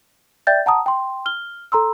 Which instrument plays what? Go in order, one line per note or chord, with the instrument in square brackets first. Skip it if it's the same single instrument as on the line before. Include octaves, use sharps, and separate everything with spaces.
[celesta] D5 E5 G5 G6 A6
F#5 A5 A#5 D#6
G5 C6
F6 G7
A4 A#5 C6 E6